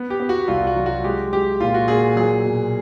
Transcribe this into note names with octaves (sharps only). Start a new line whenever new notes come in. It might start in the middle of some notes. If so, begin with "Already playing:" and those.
Already playing: B3
G4
B3
F#4
C2 F4
F#4
F#3
F#4
G#3 G4
G#3 G4
A#2 F4
F#4
A#2 G#4
F#3 G#4
B2